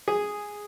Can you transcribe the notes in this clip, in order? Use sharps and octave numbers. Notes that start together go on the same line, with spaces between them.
G#4